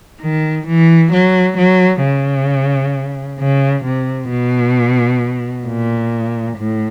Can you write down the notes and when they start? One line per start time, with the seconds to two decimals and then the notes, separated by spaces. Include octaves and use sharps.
0.22 D#3
0.68 E3
1.13 F#3
1.58 F#3
2.04 C#3
3.39 C#3
3.85 C3
4.30 B2
5.67 A#2
6.58 A2